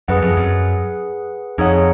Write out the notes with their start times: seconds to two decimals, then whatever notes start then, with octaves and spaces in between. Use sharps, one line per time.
0.08 F#2 G#4 B4 F#5
0.22 F2
0.37 F#2
1.58 F2 D#4 G#4 C#5 F#5